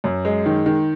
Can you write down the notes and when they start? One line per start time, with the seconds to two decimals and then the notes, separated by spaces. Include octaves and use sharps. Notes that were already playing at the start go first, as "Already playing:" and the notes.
0.04 F#2
0.25 G#3
0.46 D#3
0.66 D#3